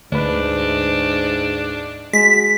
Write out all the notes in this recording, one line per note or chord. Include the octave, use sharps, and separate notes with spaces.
D2 G#2 D4 B4
G#3 F#4 B6